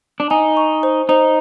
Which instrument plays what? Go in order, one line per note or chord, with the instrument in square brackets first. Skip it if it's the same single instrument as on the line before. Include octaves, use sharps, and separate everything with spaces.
[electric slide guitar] D4
[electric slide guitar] D#4 [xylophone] G#5
[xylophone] C#6
C5
[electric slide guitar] D#4 [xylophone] C5